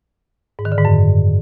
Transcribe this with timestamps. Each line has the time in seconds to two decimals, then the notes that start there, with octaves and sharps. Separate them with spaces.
0.59 G#2
0.65 D#3
0.72 D3
0.78 G#2
0.85 F#2